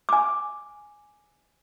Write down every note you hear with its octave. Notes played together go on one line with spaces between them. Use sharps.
G#5 D6